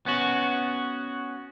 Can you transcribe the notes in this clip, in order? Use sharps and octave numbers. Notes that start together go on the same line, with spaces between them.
B3 C#4 F#4